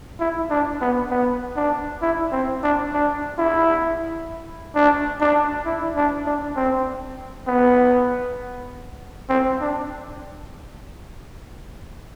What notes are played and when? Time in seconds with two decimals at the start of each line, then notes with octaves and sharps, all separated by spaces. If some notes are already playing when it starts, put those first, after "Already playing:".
0.20 E4
0.50 D4
0.81 B3
1.11 B3
1.56 D4
2.02 E4
2.32 C4
2.63 D4
2.93 D4
3.38 E4
4.75 D4
5.21 D4
5.66 E4
5.97 D4
6.26 D4
6.56 C4
7.47 B3
9.29 C4
9.61 D4